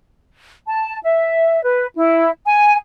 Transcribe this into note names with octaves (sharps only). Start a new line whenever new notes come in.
A5
E5
B4
E4
G#5